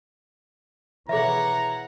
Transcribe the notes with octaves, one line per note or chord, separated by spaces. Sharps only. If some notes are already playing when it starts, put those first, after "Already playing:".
B2 E3 G#4 C#5 E5 F#5 A#5